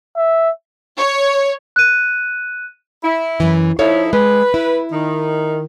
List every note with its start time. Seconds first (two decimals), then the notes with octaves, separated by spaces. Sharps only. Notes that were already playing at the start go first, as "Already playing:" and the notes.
0.16 E5
0.98 C#5
1.76 F#6 D#7
3.04 E4
3.40 F#2 E3
3.79 F3 D#4 E4 A4 C#5 F5
4.13 G#3 B4
4.54 E4
4.92 D#3